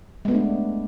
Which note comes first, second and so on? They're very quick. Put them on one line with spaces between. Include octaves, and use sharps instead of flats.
G#3 B3 A3 D4